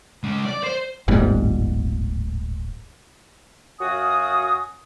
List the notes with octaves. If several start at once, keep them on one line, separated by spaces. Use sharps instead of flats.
G#3 C#4
D5
C5
D1 G1 G#2 G3
F#2 F#4 F5 G#5 D#6